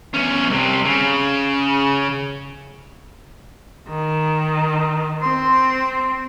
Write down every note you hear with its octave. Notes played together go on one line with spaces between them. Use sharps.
E2 C#4
C2 C3
C#3
D#3
C4 C6